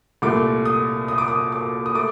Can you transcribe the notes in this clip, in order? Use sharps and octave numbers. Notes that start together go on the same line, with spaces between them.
C2 A#2 A3 D6
D#6
D#6
D6
D#6
D6
D#6
A3 D6